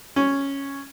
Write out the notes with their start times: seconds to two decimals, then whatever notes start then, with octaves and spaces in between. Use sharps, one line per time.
0.16 C#4